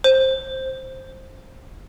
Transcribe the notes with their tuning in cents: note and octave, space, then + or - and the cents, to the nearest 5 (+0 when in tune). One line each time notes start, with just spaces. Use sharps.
C5 +10